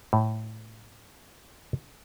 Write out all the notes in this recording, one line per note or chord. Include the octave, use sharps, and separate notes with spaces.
A2